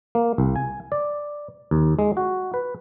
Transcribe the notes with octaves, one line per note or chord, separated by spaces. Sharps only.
A#3
C2
G#5
D5
D#2
G#3
F#4
B4